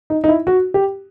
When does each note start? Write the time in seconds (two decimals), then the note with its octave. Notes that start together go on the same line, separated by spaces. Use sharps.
0.10 D#4
0.24 D#4
0.28 E4
0.47 F#4
0.74 G4